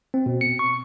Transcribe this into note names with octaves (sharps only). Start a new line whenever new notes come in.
C4
B2
C#7
C#6